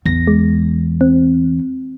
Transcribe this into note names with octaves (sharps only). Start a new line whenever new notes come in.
A1 E2 A#6
G#3
C4